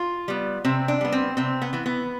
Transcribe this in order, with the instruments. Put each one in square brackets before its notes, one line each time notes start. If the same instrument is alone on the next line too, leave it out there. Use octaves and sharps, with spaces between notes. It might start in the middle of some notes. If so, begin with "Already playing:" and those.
Already playing: [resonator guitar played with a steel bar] F4
G3 B3
C3 C4
D4
G3 B3
C4
C3 C4
B3
E3 B3
B3